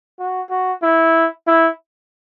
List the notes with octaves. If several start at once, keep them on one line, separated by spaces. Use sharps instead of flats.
F#4
F#4
E4
E4